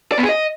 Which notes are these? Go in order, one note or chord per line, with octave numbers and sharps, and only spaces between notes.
D5
B3
G#4
D#5